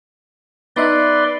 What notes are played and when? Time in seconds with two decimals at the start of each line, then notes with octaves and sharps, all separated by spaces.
0.76 B3 D#4 B4 D5 E5 C6